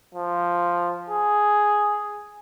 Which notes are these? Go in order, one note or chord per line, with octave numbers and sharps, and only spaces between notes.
F3
G#4